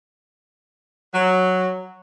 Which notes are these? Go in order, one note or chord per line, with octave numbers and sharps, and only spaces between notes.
F#3